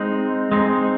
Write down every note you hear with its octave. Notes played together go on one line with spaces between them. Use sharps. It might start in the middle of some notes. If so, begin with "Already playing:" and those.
Already playing: G#3 C4 D#4
G#3 C4 D#4